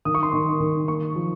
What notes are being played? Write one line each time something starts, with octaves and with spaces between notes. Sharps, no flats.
D#3 D#6
C#6
C6
D#3 C#6
D#3
A#3 C#6
F3